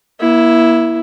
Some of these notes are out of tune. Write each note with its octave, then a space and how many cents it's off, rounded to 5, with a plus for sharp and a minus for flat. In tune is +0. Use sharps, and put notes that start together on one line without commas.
A#3 +40 E4 +0